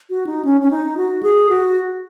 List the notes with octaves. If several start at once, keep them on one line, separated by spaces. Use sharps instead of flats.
F#4
D#4
C#4
C#4
D#4
F#4
G#4
F#4